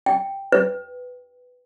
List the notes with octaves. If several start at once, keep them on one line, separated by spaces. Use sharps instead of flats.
G5
B4